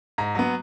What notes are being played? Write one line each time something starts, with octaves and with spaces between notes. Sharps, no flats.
G#2 A#5
F#3 B3